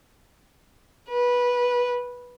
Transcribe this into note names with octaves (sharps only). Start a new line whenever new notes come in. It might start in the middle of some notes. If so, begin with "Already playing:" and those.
B4